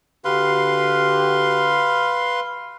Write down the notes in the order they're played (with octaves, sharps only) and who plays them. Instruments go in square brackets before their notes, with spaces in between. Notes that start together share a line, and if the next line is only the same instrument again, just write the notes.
[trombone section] D3 F#4 G4 [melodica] B4 F5 C6